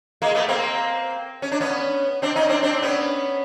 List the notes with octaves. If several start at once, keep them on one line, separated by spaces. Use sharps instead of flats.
G#3 A#3
A3 B3
A#3 C4
C#4
D4
B3 C#4
C4 D4
C#4 D#4
C4 D4
C4 D4
B3 C#4